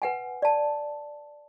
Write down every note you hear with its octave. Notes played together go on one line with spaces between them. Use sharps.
B4 F#5 G#5
D5 A5